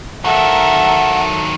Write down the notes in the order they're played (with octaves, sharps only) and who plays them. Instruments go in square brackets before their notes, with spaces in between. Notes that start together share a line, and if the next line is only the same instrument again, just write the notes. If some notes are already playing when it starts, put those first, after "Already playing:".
[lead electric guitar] D#3 F#3 [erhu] A4 [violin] A#4 E5 [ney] F#5